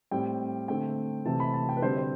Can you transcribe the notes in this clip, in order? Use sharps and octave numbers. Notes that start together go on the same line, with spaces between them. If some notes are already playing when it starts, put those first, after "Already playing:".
A2 G3 C4 G5
D3 A3 C4 G5
C3 E3 A3 C4 A5
B5
A5
G5
B4
D3 G3 C4 C5
C5